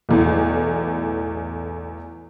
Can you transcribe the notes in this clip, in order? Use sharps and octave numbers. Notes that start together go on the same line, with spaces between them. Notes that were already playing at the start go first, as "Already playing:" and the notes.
B1 E2 A2